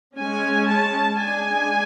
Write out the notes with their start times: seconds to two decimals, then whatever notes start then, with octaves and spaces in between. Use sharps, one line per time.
0.17 G#3 C#4 G#5
0.69 A5
1.19 G#3 D4 G#5